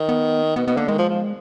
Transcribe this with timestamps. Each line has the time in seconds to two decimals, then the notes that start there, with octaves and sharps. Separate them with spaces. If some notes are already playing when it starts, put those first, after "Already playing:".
Already playing: D#3
0.09 B3
0.56 B2 B3
0.67 B2 B3
0.77 D3 A#3
0.88 D#3 G#3
0.98 F3
1.09 F3